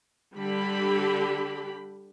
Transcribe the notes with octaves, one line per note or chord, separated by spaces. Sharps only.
D3 G3 G4 B5